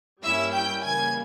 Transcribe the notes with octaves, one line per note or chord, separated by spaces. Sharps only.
G2 G3 A#3 C#4 E4 E5 E6
G5 G6
C#3 E3 G3 A#3 G#5 G#6